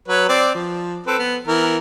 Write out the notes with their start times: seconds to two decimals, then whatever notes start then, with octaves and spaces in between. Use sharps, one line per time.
0.08 F#3 B4 C#5
0.29 C4 D5
0.55 F3
1.07 C4 A4 B4
1.19 B3
1.47 E3 B3 A#4